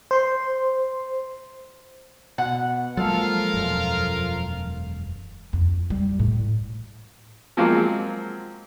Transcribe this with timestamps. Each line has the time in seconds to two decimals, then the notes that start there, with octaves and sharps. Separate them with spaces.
0.11 C5 C6
2.38 B2 F#5
2.97 F3 F#3 G#3 A#3 F4 A4 A#4 F5
3.54 E1 F#2
5.53 F2
5.90 G3
6.19 A2
7.57 F3 F#3 G#3 A#3 C4 F4